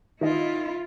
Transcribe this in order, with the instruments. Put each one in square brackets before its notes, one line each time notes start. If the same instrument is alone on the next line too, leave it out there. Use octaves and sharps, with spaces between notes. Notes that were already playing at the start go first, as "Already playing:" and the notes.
[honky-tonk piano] D#3 D#5 [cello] E4 F4